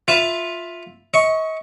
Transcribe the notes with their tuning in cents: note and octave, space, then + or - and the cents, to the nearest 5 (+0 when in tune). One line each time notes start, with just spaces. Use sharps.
F4 +10 B4 +20 E5 +0
D#5 +40 C#6 +0